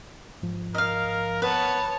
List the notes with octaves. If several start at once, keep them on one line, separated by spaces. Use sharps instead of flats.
G#2 F3
A#4 D#5 F5
B3 B4 C#5 A5